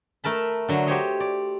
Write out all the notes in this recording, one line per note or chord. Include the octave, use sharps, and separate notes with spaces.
A3 A#4 A5 B5
D3 F#3
G4 C5 C#5 D#5
D5